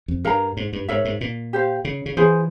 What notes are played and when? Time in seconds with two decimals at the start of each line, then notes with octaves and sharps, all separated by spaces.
0.08 F2
0.24 G2 A#4 F5 A#5
0.57 G#2
0.73 G2
0.88 G#2 A#4 C#5 E5
1.05 G#2
1.21 A#2
1.53 G4 C5 F5
1.85 C#3
2.06 C#3
2.17 E3 F4 G#4 C5